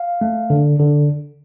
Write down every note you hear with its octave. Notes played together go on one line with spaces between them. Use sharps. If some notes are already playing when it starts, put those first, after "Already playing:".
Already playing: F5
A3
D3
D3